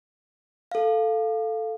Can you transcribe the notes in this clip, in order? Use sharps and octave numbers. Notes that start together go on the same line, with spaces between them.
A4 F5